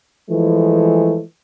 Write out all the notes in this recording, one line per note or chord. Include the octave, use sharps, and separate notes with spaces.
E3 F3 G#3 A3